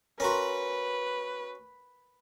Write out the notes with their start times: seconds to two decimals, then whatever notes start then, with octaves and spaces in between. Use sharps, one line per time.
0.20 C#4 F#4 A#4 B4 A#5 C6